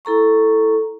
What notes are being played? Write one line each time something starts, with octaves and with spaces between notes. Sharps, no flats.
E4 A4 A#5 C#6